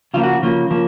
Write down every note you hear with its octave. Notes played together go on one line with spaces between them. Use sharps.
C#3 F3 A#3 F4
F#4
C#3 F3 A#3
C#3 F3 A#3